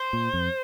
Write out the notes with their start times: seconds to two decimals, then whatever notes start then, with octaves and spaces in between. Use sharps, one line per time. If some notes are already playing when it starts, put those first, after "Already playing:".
Already playing: C5
0.13 A#2
0.34 F2